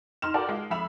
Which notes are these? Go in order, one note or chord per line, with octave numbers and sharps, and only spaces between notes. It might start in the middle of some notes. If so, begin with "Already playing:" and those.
D#4 C6 F6 E7
F#4 A4 A#4 D5 G5 A5
G#3 F4
F2 E5 B5 E7 F7